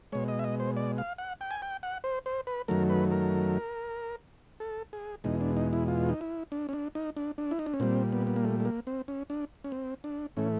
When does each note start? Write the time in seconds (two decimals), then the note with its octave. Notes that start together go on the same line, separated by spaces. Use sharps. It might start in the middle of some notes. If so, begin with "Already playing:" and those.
0.12 B2 G#3 C#5
0.28 D#5
0.39 E5
0.44 D#5
0.60 C5
0.77 D5
0.98 F5
1.18 F#5
1.41 G5
1.51 G#5
1.62 G5
1.83 F#5
2.04 C5
2.26 C5
2.47 B4
2.68 F#2 D#3 F#3 A3 A#4
2.90 B4
3.11 A#4
4.60 A4
4.93 G#4
5.24 E2 B2 G#3 D#4
5.41 D4
5.57 D#4
5.73 E4
5.88 F4
6.09 D#4
6.21 E4
6.52 D4
6.69 C#4
6.73 D4
6.95 D#4
7.17 D4
7.38 D4
7.51 E4
7.59 D#4
7.66 D4
7.74 C#4
7.80 A#2 G3 C4
8.12 B3
8.27 B3
8.36 A#3
8.45 A3
8.60 A3
8.65 A#3
8.87 C4
9.08 C#4
9.30 D4
9.64 C#4
9.72 C4
10.04 D4
10.37 A2 E3 A3 C#4